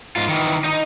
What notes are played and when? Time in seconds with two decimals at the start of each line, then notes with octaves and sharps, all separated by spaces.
0.16 G#2 F4
0.29 D#3 E3
0.64 D#4 D#5